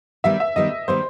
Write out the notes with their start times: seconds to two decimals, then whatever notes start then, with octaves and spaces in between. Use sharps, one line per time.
0.24 D#3 G3 B3 E5
0.40 E5
0.56 D#3 G3 B3 D#5
0.88 D#3 G3 B3 C5